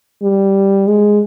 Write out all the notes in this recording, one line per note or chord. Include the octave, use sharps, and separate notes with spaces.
G3
G#3